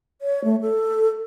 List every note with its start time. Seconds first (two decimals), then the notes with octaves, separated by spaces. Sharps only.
0.22 C#5
0.44 A3
0.61 A4